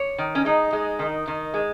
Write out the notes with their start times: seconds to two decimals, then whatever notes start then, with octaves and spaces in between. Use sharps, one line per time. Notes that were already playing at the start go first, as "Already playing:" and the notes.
Already playing: C#5
0.18 D#3
0.35 C#4
0.45 G#3 D#4
0.73 G#3
0.99 D#3
1.27 D#3
1.54 G#3